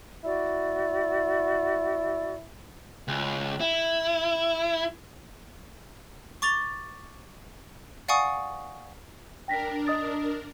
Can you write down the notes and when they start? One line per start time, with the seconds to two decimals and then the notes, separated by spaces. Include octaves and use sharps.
0.24 E4 F#4 D5
3.08 C#2
3.60 E4
6.42 C#6 D6 A6 F7 G7
8.08 D5 F5 F#5 G#5 C#6 D#6
9.48 D4 A#4 G5 A#6 B6
9.87 D#5 D#6 A6